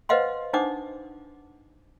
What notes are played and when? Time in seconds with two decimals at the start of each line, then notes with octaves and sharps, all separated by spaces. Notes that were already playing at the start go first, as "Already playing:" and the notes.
0.09 B4 C5 D#5 F5 F#5 C6
0.53 D4 D#4 C5 F#5 D6 D#6